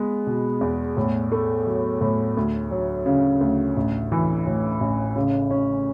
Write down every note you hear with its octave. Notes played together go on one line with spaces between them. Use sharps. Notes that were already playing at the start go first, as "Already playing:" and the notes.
Already playing: G#3 B3
B2
E2
A2
A3
F#3
A2
D2
F#3
C#3
D2
A1
E3
A2
A1
C#3
C#4